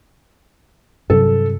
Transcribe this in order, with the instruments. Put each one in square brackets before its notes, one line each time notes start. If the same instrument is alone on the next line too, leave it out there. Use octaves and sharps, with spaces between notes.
[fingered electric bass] G2 C3 F#3 [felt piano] A4